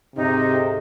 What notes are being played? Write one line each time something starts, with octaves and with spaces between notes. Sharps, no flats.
D2 G#2 C3 D#4